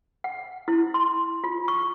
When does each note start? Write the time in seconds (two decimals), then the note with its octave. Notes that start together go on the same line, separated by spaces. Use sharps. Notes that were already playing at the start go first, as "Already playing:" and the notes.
0.24 F#5
0.68 E4
0.94 C6
1.44 F4
1.68 C#6